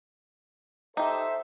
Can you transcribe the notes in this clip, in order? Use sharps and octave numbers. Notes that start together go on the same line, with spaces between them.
D#4 G4 A4 C5 E5